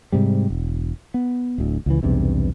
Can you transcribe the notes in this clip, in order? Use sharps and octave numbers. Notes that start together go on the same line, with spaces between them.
G#2 C3 G3
E1
B3
D1 D2
C#2 C#3 E3
B1 E2 G2 C3